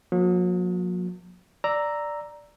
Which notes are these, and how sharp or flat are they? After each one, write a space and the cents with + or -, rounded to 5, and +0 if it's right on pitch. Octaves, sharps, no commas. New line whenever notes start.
F#3 -40 A#3 +20
D5 +0 A#5 +0 E6 +0